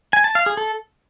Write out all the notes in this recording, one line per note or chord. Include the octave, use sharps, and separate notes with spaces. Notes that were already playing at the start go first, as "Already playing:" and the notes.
G#5
A5
F5
G#4
A4